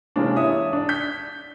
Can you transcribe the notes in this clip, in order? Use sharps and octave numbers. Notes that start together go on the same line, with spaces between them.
C3 E3 G#3 A#3 C#4 D4
C#5 E5 D#6
D4 D5
G6 B6